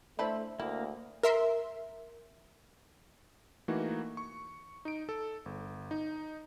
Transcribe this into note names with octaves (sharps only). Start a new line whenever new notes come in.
A3 D4 E4 A4 C5 E5 B5
D2 A#3 E4
A#4 E5 C6
E3 A3 A#3 D#4 F#4
C#6
D#4 D7
A4
G1
D#4